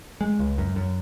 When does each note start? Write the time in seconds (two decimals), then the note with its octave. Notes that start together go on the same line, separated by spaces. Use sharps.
0.21 G#3
0.39 C#2
0.58 F#2
0.76 F#2